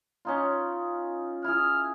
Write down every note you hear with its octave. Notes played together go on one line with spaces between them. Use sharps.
C#4 D#4 F4
E4 G#4 F6